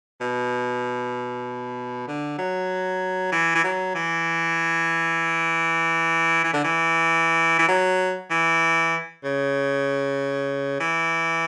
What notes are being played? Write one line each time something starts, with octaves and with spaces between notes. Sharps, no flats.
B2
D3
F#3
E3
E3
F#3
E3
E3
D3
E3
E3
F#3
E3
C#3
E3